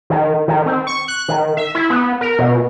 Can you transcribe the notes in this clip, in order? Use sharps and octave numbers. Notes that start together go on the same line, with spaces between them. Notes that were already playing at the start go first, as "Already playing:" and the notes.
D#3
D#3
C4
C#6
F#6
D#3
E5
E4
B3
A#4
B2